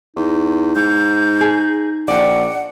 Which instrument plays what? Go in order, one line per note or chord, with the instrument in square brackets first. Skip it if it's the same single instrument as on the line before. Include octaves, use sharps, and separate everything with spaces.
[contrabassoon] E2 [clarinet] D#4
[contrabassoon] G#2 [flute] G6
[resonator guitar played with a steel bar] G#4
[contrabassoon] A#1 [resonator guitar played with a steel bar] D5 G5 [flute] F#5